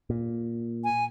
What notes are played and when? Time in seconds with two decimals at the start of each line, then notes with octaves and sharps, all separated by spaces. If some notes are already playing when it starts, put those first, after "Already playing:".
0.10 A#2
0.84 G#5